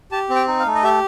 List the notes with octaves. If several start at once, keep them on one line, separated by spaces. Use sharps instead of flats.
G4 A5
C4
G5
D#4
F5
A3
D#5
G4 E5